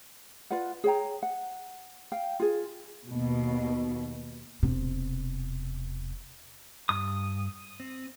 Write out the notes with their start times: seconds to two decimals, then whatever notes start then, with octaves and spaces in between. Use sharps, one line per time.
0.50 F4 B4 D5 F#5
0.84 G#4 C#5 G5 A#5
1.23 F#5
2.12 F5 G5
2.40 F4 G#4
3.10 D#2 B2
4.63 E1 C3
6.89 G2 D#6
7.80 C4